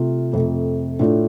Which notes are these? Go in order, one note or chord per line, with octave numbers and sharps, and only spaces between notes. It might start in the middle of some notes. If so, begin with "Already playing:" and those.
Already playing: C3 A3 F4
F2 C3 A3
A2 A3 D4 F4